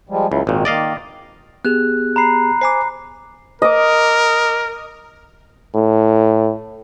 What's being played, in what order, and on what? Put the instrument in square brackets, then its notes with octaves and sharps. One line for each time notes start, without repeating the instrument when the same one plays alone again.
[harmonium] F3 G3 G#3
[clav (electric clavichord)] C#2 [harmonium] F#3 E4
[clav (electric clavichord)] G#1 A#2 [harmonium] D#3
[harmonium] D#3 A#3 [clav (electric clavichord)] D5 D#5 F5
[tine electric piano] B3 G4 G#4 [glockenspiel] F#6
[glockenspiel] A#5 B5 C7
[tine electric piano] C5 G#5 D6 [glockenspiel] C7
[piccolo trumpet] A#4 [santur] D#5 D6
[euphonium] A2